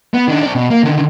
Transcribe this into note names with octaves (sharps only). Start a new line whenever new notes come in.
B3
D#3 D4
C4 D5
B2
A#3
D3 D#3